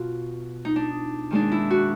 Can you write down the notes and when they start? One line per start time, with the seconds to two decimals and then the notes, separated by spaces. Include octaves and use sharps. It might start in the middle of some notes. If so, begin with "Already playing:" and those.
Already playing: B2 F4
0.65 D#4
0.76 D4
1.31 D#2 D#3 G#3 D4
1.52 E4
1.70 F#4